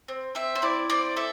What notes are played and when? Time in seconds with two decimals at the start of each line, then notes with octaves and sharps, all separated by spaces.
0.08 C4
0.35 C4 E5
0.55 C5
0.62 E4 D5
0.90 C4 D5
1.16 A4 E5